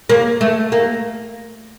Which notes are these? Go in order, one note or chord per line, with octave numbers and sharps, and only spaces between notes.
A#3
A3
A#3